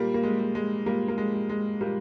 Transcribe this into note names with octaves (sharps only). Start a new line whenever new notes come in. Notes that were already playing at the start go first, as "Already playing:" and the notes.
Already playing: A#2 G3 A#3
A#3
G#3
G3
G#3
A#2 G3 A#3
A#3
G#3
G3
G#3
A#2 G3 A#3